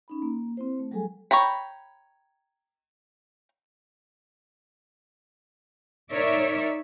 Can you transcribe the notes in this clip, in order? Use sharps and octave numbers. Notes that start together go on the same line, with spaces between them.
C#4 D#4 B5
A#3
C4 E4 C5
A3
F#3 G3 G#4 A4 G#5
C#5 G5 A#5 B5
D#4 A#4 C#5 D5 E5